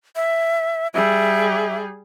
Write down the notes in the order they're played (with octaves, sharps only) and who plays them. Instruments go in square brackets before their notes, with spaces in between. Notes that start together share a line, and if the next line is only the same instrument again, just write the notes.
[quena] E5
[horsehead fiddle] G3 G#4 [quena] E5